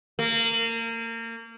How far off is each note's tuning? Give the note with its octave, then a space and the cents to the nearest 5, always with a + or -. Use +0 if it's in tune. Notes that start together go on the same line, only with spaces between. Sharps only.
A#3 -30